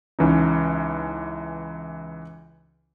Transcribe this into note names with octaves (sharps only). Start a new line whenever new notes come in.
C#2 E3 C#4 D#4